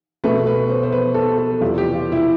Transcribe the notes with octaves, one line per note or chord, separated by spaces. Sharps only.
B2 A3 B4
B4
C5
C5
B4
A4
A4
E2 C3 G3 F4
G4
F4
E4